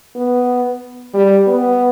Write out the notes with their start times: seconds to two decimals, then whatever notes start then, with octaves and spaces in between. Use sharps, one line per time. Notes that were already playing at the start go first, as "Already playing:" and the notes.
0.16 B3
1.14 G3
1.47 B3